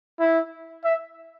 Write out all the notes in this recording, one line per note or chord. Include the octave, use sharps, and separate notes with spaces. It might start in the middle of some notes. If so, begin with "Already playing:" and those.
E4
E5